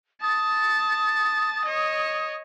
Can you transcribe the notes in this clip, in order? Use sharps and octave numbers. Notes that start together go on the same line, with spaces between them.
A5 D#6 A6
C#5 D#5